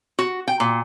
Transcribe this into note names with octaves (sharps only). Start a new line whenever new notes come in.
F#4
G5
A#2